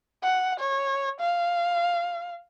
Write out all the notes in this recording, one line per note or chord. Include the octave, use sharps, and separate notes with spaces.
F#5
C#5
F5